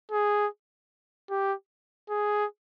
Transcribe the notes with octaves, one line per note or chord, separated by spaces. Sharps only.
G#4
G4
G#4